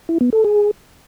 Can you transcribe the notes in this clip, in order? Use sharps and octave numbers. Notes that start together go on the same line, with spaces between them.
E4
B3
A4
G#4